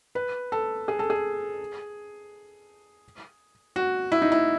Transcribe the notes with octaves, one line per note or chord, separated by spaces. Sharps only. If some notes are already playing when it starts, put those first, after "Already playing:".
B4
A4
G#4
A4
G#4
F#4
E4
D#4
E4